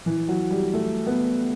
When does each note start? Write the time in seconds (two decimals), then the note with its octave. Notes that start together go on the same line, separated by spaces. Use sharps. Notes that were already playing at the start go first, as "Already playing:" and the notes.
0.06 E3
0.28 F#3
0.51 G3
0.74 A3
1.06 B3